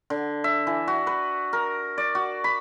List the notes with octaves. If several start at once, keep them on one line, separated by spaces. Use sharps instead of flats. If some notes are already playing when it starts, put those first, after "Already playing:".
D3
E5
E3
F#4
B4
A#4
D5
F#4
B5